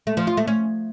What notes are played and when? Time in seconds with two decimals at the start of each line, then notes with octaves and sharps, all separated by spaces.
0.07 A3
0.17 F3
0.27 F4
0.37 A3
0.48 C#4